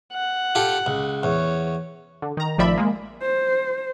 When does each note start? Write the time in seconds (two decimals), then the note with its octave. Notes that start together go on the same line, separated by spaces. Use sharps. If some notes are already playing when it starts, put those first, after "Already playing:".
0.13 F#5
0.55 F4 G4 A4
0.86 C#2
1.23 E2 C#5
2.22 D3
2.37 D#3 A#5
2.58 A1 D#3 F3 D5 E5 B5
2.77 G#3 A#3
3.22 C5